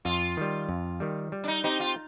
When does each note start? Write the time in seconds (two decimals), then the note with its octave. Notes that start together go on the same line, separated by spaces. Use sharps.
0.05 F2 F4
0.37 D#3 G3
0.69 F2
1.00 D#3 G3
1.32 G3
1.44 D4
1.48 D#4
1.64 C4 D#4 G4 C5
1.80 F4